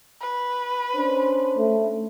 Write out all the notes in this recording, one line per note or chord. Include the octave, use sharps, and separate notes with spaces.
B4
C#4 D4 C5
A3